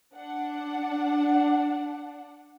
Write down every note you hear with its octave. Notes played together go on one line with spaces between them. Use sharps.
D4 F#5